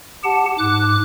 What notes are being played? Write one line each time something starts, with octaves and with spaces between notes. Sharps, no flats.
G4 F#5 A5
G#2 D6 F#6